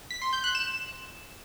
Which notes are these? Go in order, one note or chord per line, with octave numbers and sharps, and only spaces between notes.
B6
C6
G6
F#6
E7